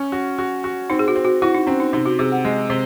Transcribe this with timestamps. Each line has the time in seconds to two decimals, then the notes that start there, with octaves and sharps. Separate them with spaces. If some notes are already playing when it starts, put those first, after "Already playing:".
Already playing: C#4
0.12 F#4
0.39 F#4
0.64 F#4
0.90 C4 D#4
0.99 G#4
1.08 F#4
1.16 C4
1.25 F#4
1.42 E4 F#4
1.55 D#4
1.67 C4 C#4
1.80 D#4
1.93 C3 D#4
2.06 F#4
2.19 C3 G#4
2.32 F#5
2.45 G#3
2.70 C3